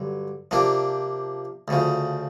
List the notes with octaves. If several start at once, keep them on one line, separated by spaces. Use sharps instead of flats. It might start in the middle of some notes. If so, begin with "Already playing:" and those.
Already playing: G2 D3 F#3
C3 F3 A#3 D4
D2 C#3 F3